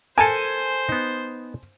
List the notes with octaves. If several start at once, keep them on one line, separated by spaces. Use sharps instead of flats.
A4 A#4 C5 G#5 A5
B3 D#4